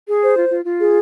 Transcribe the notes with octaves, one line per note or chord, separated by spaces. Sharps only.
G#4
C5
F4
F4
F4
G#4